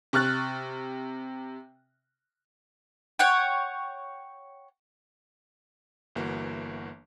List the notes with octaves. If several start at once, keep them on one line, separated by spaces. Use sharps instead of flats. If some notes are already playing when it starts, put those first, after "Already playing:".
C3 C#6 F6 F#6 A6
C#5 F#5 G5
G1 E3 A#3 F#4